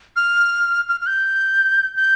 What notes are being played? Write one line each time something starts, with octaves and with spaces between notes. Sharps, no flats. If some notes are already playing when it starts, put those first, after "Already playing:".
F6
F6
F6
G6
G6